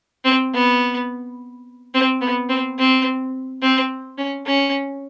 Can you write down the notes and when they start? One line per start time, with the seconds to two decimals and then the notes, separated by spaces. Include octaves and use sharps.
0.25 C4
0.54 B3
1.94 C4
2.21 B3
2.49 C4
2.78 C4
3.62 C4
4.18 C#4
4.46 C#4